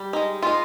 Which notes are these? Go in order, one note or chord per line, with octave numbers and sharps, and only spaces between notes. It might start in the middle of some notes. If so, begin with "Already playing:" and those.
Already playing: G3
G#3 D#4
G#3 D#4 F4